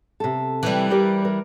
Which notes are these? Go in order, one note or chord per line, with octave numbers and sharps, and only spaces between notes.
C3 A4
E3 G3
G4 A#4 D5
A#4